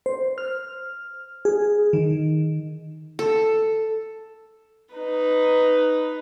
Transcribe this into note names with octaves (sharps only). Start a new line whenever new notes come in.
C5
F6
G#4
D#3
A4
D#4 B4